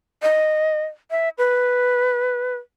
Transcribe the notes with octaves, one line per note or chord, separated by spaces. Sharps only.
D#5
E5
B4